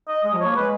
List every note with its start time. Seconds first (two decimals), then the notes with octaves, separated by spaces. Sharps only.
0.08 D#5
0.23 G#3 D#5
0.35 F3
0.40 A#3 C#5
0.56 G#3 B4